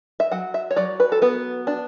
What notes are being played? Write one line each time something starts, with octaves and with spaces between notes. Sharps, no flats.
E5
F#3 F#5
E5
C#5
F#3 D5
B4
A4
B3 B4
D4